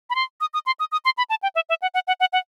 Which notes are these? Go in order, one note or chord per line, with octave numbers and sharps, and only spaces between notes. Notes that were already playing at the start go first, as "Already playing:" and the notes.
B5
C6
D#6
D#6
C6
D#6
D#6
C6
B5
A5
G5
E5
E5
F#5
F#5
F#5
F#5
F#5